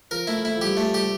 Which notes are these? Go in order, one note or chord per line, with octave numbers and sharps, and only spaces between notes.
F3 A#4
A3 E4
A3 E4
F3
G3 G4
A3
G3 G4